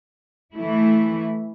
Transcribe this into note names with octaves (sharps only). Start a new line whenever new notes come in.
E3 A3 E4